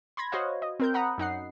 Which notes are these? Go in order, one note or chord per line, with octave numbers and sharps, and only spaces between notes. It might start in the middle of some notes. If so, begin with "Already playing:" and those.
B5 C6 G#6 A#6
F#4 C5 C#5 D#5 F5
D#5
C4 A#4 G6
F#5 A#5 B5 D#6
F#2 D#4 F#5 C7